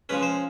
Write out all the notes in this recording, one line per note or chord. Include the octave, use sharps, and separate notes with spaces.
F3 G#3 C#4 B4
C5